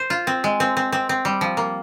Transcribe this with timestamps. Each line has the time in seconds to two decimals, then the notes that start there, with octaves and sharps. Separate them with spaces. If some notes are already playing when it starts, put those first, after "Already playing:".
Already playing: C5
0.10 F4
0.27 C4
0.44 G#3
0.60 C4
0.77 C4
0.92 C4
1.09 C4
1.25 G3
1.41 F3
1.57 A#3